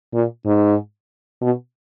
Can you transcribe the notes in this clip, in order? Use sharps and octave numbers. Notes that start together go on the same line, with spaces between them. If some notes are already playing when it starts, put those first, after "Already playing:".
A#2
G#2
B2